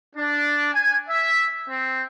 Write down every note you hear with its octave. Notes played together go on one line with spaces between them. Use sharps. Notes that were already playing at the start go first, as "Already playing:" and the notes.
D4
G#5
E5
C4